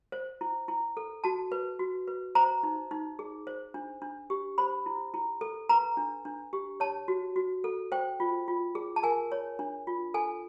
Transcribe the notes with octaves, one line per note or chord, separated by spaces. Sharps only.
C5
E4
E4
A4
F#4 A5
B4
F#4
B4
C5 A#5
D#4
D#4
G#4
C5
D4
D4
G4
C5 B5
E4
E4
A4
B4 A#5
D4
D4
G4
C#5 A5
F#4
F#4
A4
C5 G5
F4
F4
G#4
A5
A#4 G#5
C#5
D4
F4
A4 G#5